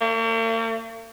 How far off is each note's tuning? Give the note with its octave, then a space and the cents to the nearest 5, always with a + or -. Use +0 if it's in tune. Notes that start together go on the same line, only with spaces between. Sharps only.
A#3 -45